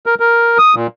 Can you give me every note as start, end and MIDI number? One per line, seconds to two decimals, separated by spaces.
0.06 0.15 70
0.20 0.58 70
0.58 0.75 87
0.75 0.87 46